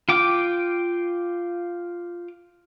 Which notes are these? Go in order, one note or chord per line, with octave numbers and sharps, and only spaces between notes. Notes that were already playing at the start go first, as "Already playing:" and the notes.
F4 G5 D6